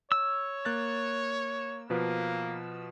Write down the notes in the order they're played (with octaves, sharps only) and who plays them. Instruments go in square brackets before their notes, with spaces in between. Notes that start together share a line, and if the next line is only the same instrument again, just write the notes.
[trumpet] C#5 [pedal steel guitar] E6
[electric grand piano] A#3 F#6 A6
[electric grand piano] B2 F3 B4 [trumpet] A#3